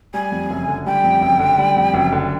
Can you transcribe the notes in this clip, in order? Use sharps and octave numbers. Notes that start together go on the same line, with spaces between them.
G3 G#5
F2
F#1
D3
G3 G5
F2
F#1
D3
G3
F2
F#1
D3